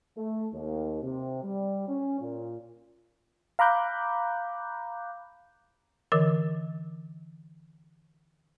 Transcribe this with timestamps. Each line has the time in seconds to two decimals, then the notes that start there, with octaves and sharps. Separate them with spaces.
0.17 A3
0.53 D#2
1.03 C3
1.43 G3
1.88 C#4
2.20 A#2
3.59 F5 A#5 B5 D6 F#6 G6
6.12 D3 E3 A#4